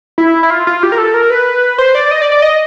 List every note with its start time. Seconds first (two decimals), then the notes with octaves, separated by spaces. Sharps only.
0.18 E4
0.43 E4
0.50 F4
0.67 F4
0.83 G4
0.92 A#4
0.98 A4
1.14 A#4
1.30 B4
1.78 C5
1.95 D5
2.11 D#5
2.22 D5
2.32 D5
2.42 D#5